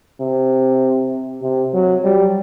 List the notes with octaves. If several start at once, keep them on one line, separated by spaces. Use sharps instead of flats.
C3
C3
F#3
G3